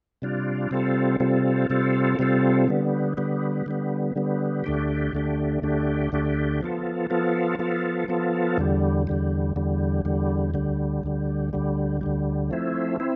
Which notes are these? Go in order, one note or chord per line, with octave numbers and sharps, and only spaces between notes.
C3 G3 D4 F4
C3 G3 C4 F4 A4
C3 G3 C4 F4 A4
C3 G3 C4 F4 A4
C3 G3 C4 F4 A4
D3 G3 B3
D3 G3 B3
D3 G3 B3
D3 G3 B3
D2 D3 A3 D4 G4
D2 D3 A3 D4 G4
D2 D3 A3 D4 G4
D2 D3 A3 D4 G4
F3 B3 F4 A4
F3 B3 F4 A4
F3 B3 F4 A4
F3 B3 F4 A4
E2 D3 G3
E2 D3 G3
E2 D3 G3
E2 D3 G3
D2 D3 G3
D2 D3 G3
D2 D3 G3
D2 D3 G3
F3 A3 C4 E4
C4 E4